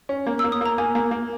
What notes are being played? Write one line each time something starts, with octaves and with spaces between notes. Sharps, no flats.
C#4
A#3
E6
A#3
D#6
A#3 A#5
A#3 G#5
A#3
A#3